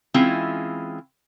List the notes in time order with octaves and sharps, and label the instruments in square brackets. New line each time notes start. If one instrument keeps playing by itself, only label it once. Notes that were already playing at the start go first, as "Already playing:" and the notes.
[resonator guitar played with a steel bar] E3 G#3 C4 C#4 E4 F4